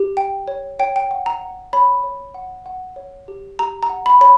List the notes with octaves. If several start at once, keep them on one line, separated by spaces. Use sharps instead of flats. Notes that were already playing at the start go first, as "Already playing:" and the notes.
Already playing: G4
G5
C#5
C#5 G5
G5
F#5
A#5
F#5
C#5 B5
C#5
F#5
F#5
C#5
G4
G4 A#5
A#5
F#5
B5
C#5 B5